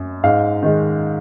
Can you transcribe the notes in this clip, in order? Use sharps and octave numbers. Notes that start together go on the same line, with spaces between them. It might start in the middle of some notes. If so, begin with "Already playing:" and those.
Already playing: F#2
G#2 F5
D#3 G#3